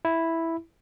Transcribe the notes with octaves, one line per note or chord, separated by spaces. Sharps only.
E4